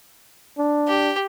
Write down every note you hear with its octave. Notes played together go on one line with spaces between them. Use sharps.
D4
G4